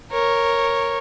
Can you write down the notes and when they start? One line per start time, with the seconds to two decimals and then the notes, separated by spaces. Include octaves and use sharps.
0.12 A#4 C#5